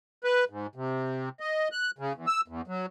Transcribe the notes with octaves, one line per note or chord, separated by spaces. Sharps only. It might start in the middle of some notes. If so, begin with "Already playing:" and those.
B4
G#2
C3
D#5
F#6
C#3
E2
E6
E2
F#3